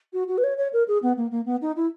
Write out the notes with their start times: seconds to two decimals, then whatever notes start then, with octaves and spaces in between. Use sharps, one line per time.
0.13 F#4
0.28 F#4
0.38 B4
0.44 C#5
0.58 C#5
0.73 A#4
0.88 G#4
1.03 B3
1.17 A#3
1.31 A#3
1.46 B3
1.62 D#4
1.76 E4